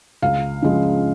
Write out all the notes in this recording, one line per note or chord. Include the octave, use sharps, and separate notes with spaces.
C#2 F5
C#3 F3 G#3